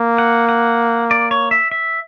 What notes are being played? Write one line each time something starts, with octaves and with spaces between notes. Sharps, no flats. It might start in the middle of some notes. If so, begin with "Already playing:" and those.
Already playing: A#3
F#5
F#5
D5
C#5
E5
E5